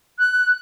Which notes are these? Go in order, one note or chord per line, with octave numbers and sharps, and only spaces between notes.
F#6